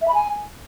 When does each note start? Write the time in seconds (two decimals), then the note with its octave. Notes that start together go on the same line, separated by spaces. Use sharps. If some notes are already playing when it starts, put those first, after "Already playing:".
0.02 E5
0.08 B5
0.14 G#5